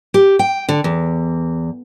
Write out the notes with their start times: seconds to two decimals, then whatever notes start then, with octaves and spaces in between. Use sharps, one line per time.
0.14 G4
0.39 G5
0.69 D3
0.84 E2